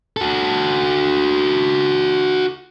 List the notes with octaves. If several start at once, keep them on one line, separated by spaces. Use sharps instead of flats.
F#4 A4